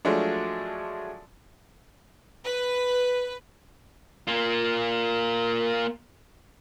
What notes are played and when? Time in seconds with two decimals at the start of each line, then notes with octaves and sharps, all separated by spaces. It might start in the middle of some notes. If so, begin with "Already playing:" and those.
0.05 F3 F#3 G#3 A3 D4
2.44 B4
4.27 A#3 F4